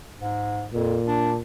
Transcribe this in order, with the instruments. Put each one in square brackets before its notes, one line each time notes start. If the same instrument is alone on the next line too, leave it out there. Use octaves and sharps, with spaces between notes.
[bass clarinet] G#2
[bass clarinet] F2 [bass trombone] A#2
[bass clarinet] D4